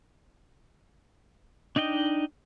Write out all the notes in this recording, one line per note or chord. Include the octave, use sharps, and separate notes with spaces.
D4 D#4 D#5 G5